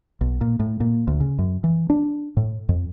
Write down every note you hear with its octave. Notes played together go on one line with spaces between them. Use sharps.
B1
A#2
A2
A#2
D2
C#3
F#2
E3
D4
A2
F2